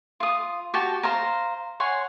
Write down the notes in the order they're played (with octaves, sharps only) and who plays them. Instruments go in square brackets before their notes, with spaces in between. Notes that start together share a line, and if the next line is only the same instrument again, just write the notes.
[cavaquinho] F4 D#6
F#4 G4 G5 A5
C5 F5 A#5
C#5 F#5 G#5 C6